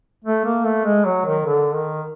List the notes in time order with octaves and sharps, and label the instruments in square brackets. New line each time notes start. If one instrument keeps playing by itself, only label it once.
[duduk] A3
A#3
A3
G#3
F#3
D#3
D3
D#3